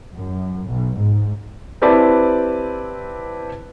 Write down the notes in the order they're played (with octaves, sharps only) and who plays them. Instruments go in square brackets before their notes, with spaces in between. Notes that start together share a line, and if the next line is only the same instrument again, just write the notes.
[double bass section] F#2
B1
G#2
[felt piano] C4 E4 G4 B4 D5 A5